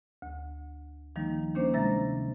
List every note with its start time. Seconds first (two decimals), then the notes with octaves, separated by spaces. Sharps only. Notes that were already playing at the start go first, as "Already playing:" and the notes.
0.22 D2
1.16 D#3 F3 G3 A#3 D#4
1.55 D#3 A#3 C#4 D4 C5
1.74 C3 G#3 E5 A#5 A6 A#6